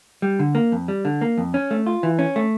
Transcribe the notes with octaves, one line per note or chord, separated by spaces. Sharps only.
G3
D3
A#3
F2
G3
D3
A#3
F2
C#4
A3
F4
E3
C#4
A3